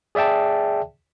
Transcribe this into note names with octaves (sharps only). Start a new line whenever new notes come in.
G#4 D5 E5 G5 A5